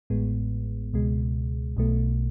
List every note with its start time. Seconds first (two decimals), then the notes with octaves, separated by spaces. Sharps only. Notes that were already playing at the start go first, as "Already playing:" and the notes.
0.10 A1 A2 G#3 B3
0.94 C#2 B2 G#3
1.77 B1 B2 A3